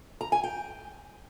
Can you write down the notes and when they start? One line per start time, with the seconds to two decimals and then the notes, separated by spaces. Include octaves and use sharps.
0.21 A#5
0.32 G#5
0.44 G5